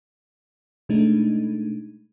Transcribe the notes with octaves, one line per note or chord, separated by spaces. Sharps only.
B2 G#3 A3 D4 D#4